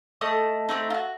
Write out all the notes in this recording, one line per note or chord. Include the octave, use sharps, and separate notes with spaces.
A3 D#5 A5 D#6
A3 A#3 C4 D#4
F4 F#4